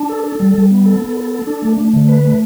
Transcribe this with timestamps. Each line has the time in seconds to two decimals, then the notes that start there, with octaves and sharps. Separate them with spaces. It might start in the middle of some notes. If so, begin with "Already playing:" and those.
Already playing: D4
0.09 A4
0.24 A4
0.40 G3
0.55 G3
0.71 B3
0.86 A4
1.01 B3
1.17 A4
1.31 A4
1.47 D4
1.62 A3
1.78 A3
1.93 D3
2.09 B4
2.25 A3